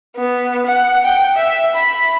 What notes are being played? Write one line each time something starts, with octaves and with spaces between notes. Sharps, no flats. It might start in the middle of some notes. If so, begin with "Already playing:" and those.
B3
F#5
G5
E5
B5